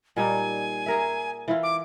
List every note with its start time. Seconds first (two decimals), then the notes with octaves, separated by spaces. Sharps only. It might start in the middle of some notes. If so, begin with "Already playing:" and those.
0.16 A#2 G3 D#4 G#5
0.86 G#4 A#4 E5
1.48 E3 E4 F4
1.63 D6